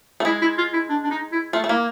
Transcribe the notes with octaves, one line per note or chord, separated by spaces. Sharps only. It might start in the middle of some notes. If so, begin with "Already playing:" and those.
A3
G#3 E4
E4
F4
E4
D4
D4
D#4
E4
A3 F4
A3
A#3 E4